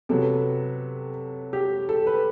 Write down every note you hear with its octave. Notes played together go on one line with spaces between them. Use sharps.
C3 F#3 B3 A4
G4
A4
B4